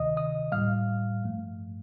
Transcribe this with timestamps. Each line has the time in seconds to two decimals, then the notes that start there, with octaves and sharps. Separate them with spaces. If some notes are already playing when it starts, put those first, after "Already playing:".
Already playing: D2 C3 D#3 D#5 D#6
0.17 D#5 D#6
0.52 A2 G3 F5 F6
1.23 G2 F3 A3